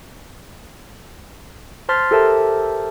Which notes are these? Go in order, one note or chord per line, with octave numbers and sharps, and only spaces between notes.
C5 A5 C6 F6 A6 B6
G4 A4 A#4 C5 E5 A5